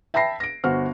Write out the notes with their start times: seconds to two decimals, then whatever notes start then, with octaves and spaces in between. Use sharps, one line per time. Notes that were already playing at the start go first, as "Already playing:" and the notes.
0.14 E5 G5 A5 B5 A#6 C7
0.40 A#6 D7
0.64 G1 F#4 C5 F6